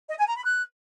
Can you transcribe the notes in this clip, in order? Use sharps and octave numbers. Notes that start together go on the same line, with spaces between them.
D#5
G#5
A#5
B5
F#6